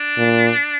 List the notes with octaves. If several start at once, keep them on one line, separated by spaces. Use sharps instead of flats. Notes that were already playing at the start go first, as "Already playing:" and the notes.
Already playing: D4
A#2